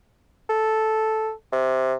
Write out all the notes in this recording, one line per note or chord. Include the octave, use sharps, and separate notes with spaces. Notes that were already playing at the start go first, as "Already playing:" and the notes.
A4
C3